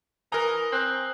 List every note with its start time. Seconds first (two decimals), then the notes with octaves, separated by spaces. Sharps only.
0.32 E3 A#4 G#5 A#5 D#6 G7
0.72 C4 F#6 F#7